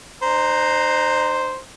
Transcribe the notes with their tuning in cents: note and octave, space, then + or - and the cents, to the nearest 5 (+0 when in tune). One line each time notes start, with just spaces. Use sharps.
D#4 -45 C5 +0 A#5 +0